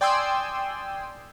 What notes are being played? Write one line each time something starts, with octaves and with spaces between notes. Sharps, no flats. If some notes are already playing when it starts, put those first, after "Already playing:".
D5 G5 G#5 C6 D#6 E6